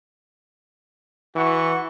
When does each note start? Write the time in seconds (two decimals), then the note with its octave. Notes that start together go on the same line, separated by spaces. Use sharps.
1.36 E3 F#4 F#5 C#6